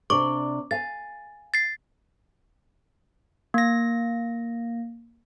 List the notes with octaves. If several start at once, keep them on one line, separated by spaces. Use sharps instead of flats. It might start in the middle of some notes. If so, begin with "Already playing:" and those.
C3 D4 D5 C#6 D6
F5 G#5 A6
A6 C7
A#3 A#6